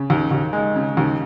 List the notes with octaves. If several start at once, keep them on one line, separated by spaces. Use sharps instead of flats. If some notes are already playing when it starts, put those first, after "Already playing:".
Already playing: C#3
D#2
D#2
G#3
C#3
D#2